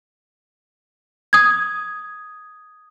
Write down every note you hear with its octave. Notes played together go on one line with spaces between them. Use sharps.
D#6 G#6